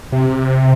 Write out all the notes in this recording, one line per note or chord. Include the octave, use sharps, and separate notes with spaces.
C3